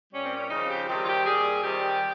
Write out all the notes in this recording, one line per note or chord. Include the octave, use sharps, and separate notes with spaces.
A#2 G3 C#4
C4
C#4
C#3 F3 D#4
G4
C3 D#3 G3 G4
F4
G4
A#2 G3 G#4
C3 D#3 G3 G4